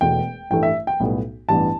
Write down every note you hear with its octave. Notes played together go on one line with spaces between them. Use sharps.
E1 E2 B2 A3 G5
A1 G2 E3 A3 G5
E5
G5
B1 A2 G3 B3
A1 G2 E3 G3 B3 A5